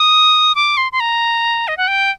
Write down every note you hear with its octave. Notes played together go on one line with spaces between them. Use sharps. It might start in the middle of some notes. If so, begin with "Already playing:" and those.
Already playing: D#6
D6
C6
C6
A#5
D#5
F#5
G5